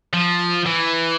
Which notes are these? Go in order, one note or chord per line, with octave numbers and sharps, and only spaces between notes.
F3
E3